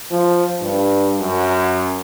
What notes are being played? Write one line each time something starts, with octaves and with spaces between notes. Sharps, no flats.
F3
G2
F#2